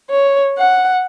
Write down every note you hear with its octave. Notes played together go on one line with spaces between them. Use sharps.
C#5
F#5